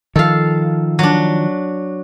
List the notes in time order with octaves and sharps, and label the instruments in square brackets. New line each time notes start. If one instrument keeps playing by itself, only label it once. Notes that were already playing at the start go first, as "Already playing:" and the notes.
[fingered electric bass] D#3 F3 [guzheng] A4 F5
[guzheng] F#3 D4